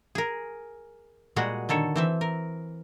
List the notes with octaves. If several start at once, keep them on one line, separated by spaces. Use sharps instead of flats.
G#4 A#4
A#2 G3 G#3 F#4 G#4 F#5
D3 D#3 A4 C#5
E3 C4 E5
A#4